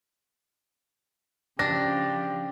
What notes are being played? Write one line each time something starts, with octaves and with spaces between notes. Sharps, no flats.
C#3 F3 D4 G4 A#6